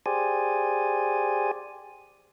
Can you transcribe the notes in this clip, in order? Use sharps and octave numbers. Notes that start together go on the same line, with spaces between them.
G4 G#4 C5 D5 G#5